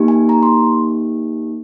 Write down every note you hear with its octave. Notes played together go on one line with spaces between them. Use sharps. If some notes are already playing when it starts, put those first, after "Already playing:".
Already playing: A#3 D#4 G4
G#5
A#5
C6